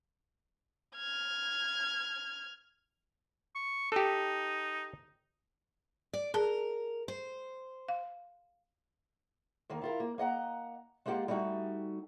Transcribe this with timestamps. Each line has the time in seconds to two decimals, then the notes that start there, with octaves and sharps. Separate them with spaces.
0.96 F6 G#6
3.55 C#6
3.92 D#4 G4 A4
6.13 D5
6.34 G#4 A#4 A5
7.08 C5
7.89 F5
9.70 D#2 D#3 A#3
9.81 E4 F4 A#4
10.00 A#3
10.18 A#3 D#5 F#5 A#5
11.06 G#3 A#3 F4 G4 F#5
11.28 G3 A3 D#4 F#4 G4